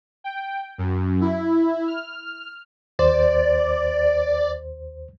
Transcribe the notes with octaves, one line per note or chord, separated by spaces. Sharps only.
G5
F#2
E4
F6
D#2 C5 D5